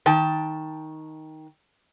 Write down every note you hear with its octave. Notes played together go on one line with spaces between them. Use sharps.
D#3 G5 A5